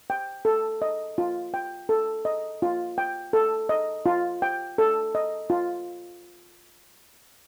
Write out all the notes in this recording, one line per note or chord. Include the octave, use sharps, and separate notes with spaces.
G5
A4
D#5
F4
G5
A4
D#5
F4
G5
A4
D#5
F4
G5
A4
D#5
F4